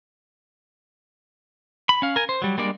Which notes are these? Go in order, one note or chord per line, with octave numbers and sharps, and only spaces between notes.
B5
C#4 F5
A#4 G#5
C5
F#3 G3
G3 G#3 A#3 D4 D5